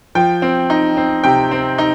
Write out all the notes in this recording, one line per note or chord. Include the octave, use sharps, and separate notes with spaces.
F3 G5
C4
D#4
C4
C3 G5
C4
D#4